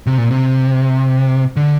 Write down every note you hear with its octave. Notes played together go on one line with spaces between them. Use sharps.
C3
A#2
C3
D3